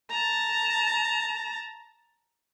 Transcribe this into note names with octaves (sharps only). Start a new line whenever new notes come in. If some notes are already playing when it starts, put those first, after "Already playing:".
A5 A#5